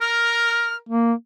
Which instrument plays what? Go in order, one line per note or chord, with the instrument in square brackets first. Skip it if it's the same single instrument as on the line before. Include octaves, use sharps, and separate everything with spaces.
[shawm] A#4 [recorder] F6
[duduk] A#3